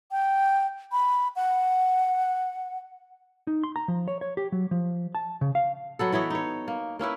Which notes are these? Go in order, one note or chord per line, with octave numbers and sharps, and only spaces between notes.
G5
B5
F#5
D#4
C6
A#5
F3
C#5
C#5
G4
F#3
F3
A5
C#3
F5
F#3 B3 A4
E3 E4 C#5 D#5
D#4 C#5
A#3
A#3 C#4 E4 B4